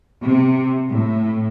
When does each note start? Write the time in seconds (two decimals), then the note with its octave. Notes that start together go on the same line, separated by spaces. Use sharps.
0.22 C3
0.91 A2